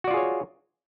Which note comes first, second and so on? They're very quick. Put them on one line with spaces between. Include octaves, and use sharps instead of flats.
F#4 D5 F4 G#4 C#5